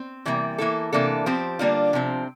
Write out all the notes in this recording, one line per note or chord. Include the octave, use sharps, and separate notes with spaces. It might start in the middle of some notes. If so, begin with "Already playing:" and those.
Already playing: C4
C3 E3 G3 A#3
E3 A#3 E4 A4
C3 E3 A#3 D4 A4
F3 C4 G4 C5
D3 G3 A#3 D4 F4
C3 F3 C4